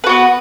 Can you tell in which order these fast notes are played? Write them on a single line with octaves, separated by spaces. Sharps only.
B4 F#4 B3